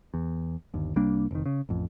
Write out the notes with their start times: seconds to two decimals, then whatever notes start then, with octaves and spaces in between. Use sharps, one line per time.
0.14 E2
0.74 G1 D#2
0.96 C2 G3 A#3 D4
1.31 F1 D#3
1.46 C#3
1.69 A1 F2